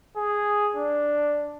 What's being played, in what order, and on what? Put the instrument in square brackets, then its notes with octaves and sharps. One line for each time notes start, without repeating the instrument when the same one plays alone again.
[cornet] G#4
D4